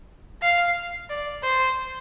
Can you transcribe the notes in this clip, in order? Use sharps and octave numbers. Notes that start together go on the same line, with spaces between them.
F5
D5
C5